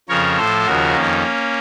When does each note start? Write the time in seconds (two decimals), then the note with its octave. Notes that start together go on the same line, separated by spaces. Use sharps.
0.09 F2 C#3 F3 A#4 C#5
0.37 A2 F3 A4 C5
0.66 D#2 C#3 F3 F#4 A#4
0.94 F2 D#3 A#3 C#4